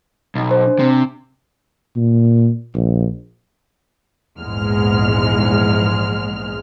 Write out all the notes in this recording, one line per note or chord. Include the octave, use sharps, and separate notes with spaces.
B1
C5
D4
C3
A#2
A#1
A#1 E2 G#2 G#3 F6